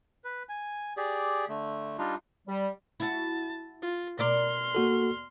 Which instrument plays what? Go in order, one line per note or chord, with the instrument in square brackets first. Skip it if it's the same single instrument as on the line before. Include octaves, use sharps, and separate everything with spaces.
[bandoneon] B4
G#5
G4 G#4 D5
D3 A3
G3 D4 D#4 F4
[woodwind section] G3
[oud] E4 F#4 [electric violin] A5
[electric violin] F4
[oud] B2 A#4 D5 [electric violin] C6 F6
[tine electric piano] A#3 F#4 A4